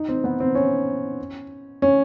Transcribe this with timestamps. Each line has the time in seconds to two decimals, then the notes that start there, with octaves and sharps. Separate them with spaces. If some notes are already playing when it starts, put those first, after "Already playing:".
Already playing: D#4
0.09 C4
0.24 B3
0.40 C4
0.55 C#4
1.82 C#4